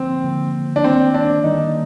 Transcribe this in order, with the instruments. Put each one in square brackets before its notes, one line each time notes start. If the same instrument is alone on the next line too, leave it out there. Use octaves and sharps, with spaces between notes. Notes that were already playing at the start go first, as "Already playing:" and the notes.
Already playing: [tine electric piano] D3 F3 A#3 [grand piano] C4
[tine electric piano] D3 F3 A#3
[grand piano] D4
[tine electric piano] D#3 G3 A#3 [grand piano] C4
[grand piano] D4
[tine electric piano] D#3 G3 A#3 [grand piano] D#4